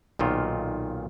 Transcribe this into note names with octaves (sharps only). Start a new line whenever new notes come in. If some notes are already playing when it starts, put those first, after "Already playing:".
B1 A#2 D#3 F4